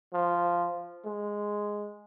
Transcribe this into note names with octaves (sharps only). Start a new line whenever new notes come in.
F3
G#3